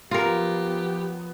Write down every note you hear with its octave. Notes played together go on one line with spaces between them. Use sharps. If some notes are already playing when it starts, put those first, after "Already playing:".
F3 F#3 B3 F4 G4 A#4